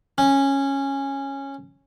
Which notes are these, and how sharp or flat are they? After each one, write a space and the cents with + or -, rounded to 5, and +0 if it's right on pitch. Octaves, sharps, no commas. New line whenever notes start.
C#4 -10